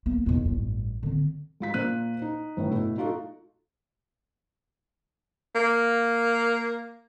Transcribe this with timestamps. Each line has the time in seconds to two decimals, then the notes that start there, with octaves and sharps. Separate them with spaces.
0.06 A#3 B3
0.26 B1 E2
0.45 A1 G2
1.03 D3 C4
1.60 G#2 F4 B6
1.74 A#2 A#3 C5 F#6 D#7
2.22 D#4
2.57 G1 A2 E3
2.71 B2 A3 B3 E4
2.97 A3 D#4 F4 F#4 A4
5.55 A#3